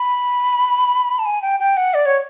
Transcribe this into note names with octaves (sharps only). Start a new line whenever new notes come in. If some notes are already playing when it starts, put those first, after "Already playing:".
Already playing: B5
A5
G#5
G5
G5
F#5
D5
C#5